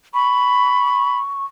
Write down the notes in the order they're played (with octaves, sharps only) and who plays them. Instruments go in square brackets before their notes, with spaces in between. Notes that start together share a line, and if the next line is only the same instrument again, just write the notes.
[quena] B5 [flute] C#6